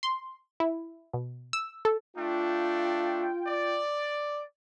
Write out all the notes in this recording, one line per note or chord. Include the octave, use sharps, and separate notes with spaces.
C6
E4
B2
E6
A4
A3 D4 F4 G5
D5